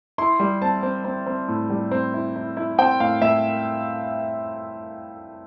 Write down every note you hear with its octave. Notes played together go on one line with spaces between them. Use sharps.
E4 C6
G3
C4 A5
C4
C4
C4
A2
G3
C4
E4
E4
E4
C4 G5
A2 F5
A2 E5